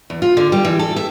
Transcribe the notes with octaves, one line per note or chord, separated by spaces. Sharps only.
E2
F4
D3
G3
E3
A4
E5